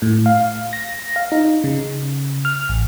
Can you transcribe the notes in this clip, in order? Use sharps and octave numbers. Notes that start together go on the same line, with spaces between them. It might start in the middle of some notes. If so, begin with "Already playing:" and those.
A2
F5
A#6
F5
D#4
C#3
F6
A1